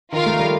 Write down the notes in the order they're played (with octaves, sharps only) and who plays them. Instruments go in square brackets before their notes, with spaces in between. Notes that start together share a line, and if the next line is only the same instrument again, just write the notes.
[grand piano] D#3 [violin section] F4 A#4 F5
[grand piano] A3
G3